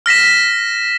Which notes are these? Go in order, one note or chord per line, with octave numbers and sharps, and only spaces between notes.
F6 A#6 B6 E7